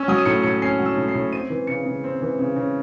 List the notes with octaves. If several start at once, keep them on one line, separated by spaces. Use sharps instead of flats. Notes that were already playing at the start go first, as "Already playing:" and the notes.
Already playing: C#4 E6
F#3 D#6
D#7
A2 C#7
A2 C#7
C#4 C7
F#3
E6
A2
C7
A2
C4 D#7
E3
C#3 C#7
C#3
C4
E3
C#3
C#3